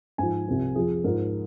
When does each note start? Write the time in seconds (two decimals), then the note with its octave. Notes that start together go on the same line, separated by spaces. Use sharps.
0.18 G#2 F3 G#5
0.47 C2 C3 F3
0.75 F2 F3 G#4
1.04 G#2 F3 A#4